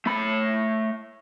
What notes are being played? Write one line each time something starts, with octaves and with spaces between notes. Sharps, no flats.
A3 B5